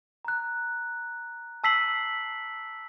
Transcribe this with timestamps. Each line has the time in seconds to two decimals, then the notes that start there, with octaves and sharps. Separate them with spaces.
0.25 A#5 F#6
1.64 A5 E6 B6 C7 F#7